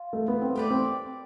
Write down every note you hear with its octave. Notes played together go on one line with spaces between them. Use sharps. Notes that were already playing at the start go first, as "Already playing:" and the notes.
Already playing: F4
A3
B3
C4
A3 G4 B4 D5
C4